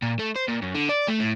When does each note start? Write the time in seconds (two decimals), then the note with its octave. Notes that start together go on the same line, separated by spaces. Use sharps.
0.02 A#2
0.19 A3
0.36 C5
0.48 A#2
0.62 F#2
0.75 D3
0.89 D5
1.08 A3
1.20 A2